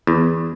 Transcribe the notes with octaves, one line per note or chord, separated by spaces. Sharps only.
E2